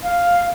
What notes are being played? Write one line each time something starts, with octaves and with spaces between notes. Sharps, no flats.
F5